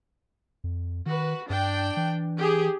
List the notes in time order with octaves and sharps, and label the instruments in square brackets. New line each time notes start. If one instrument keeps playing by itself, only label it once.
[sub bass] F2
[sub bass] D#3 [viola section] F#4 B4
[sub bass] G2 [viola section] D4 G5
[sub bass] E3
[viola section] G4 G#4